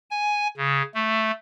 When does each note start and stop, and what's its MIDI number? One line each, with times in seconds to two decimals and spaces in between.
0.10 0.47 80
0.57 0.82 49
0.95 1.31 57